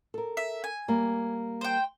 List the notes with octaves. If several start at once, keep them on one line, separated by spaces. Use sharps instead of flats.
A4 A#4
E5
G#5
G3 A#3
C5 G5